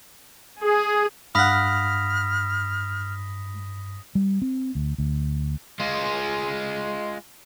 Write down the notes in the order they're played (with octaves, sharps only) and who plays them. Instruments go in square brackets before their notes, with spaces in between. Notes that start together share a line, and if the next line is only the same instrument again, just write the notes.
[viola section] G#4
[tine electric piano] G2 B5 [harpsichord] F5 F#5 [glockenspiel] D#6 A#6 B6 [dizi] F6
[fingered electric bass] G3
C4
D2
D2
[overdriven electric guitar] G#3 F4